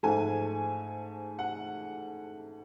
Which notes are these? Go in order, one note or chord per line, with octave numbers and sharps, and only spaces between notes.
G#2 F3 A3 G#5
F#5